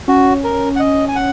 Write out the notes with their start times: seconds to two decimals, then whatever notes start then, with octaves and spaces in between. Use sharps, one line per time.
0.08 C#4 F#4
0.44 A#4
0.76 F#5
0.80 D#5
1.08 G#5
1.16 F#5